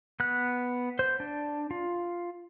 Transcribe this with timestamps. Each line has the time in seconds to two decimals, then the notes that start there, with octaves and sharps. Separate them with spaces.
0.20 B3 F#6
0.99 C5
1.20 D4
1.71 F4